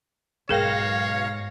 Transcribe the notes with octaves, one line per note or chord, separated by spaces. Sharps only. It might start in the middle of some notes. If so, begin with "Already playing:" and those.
B1 G#2 G#4 A#4 C#5 F5 G5 A#6